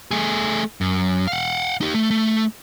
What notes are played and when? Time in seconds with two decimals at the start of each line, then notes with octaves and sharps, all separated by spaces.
0.11 A3 G#4
0.81 F#2
1.27 F5 F#5
1.81 D#4 G4
1.94 A3
2.11 A3